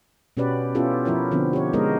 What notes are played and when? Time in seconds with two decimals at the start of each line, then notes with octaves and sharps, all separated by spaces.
0.37 B2 C#4 F#4 G4 B4 D5
0.75 B3 C#4 E4 F4 G4 A4
1.05 F3 E4 A#4 C#5
1.31 D3 F3 B3 C4 D4
1.53 G4 C#5
1.73 G#3 B3 D#4 A#4 C5 D#5